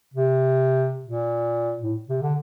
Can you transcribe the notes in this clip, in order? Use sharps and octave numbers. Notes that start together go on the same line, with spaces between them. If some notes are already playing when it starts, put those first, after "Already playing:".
C3
A#2
A2
C3
D3